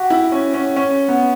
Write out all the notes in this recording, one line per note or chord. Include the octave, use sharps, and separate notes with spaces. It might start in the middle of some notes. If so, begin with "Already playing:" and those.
Already playing: F#4 G4
E4
C#4
C#4
C#4
B3